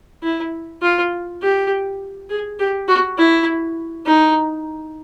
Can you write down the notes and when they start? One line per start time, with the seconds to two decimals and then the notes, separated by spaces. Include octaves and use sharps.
0.23 E4
0.82 F4
1.42 G4
2.30 G#4
2.59 G4
2.88 F#4
3.18 E4
4.06 D#4